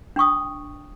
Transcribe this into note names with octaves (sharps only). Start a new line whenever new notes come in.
D4 G5 C#6 D#6